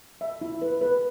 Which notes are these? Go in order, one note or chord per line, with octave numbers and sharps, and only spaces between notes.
E5
E4
B4
B4